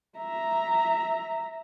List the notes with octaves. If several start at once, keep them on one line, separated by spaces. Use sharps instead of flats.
E5 A#5